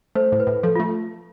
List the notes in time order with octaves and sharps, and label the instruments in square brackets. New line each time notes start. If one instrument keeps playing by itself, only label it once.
[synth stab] A3 [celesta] C5
[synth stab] A2
[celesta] B4
[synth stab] A2
[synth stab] F3 [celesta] A4
[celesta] F4
[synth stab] A3